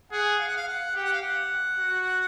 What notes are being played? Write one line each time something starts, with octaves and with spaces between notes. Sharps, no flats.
G#4 F#5
F5
F#5
F5
F#5
G4 G5
F#5
F5
F#5
F#4